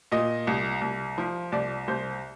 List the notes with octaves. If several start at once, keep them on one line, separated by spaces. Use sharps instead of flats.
A#2 D#5
C2
C2
F3
C2 D5
C2 C5